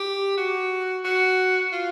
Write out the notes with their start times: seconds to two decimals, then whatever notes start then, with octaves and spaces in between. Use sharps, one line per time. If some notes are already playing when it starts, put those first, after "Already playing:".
Already playing: G4
0.37 F#4
1.05 F#4
1.73 F4